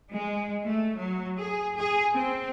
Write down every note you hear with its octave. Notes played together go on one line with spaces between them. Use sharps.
G#3
A3
F#3
G#4
G#4
C4